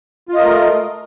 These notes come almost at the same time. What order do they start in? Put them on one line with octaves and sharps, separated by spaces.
F4 D#5 A#4 A3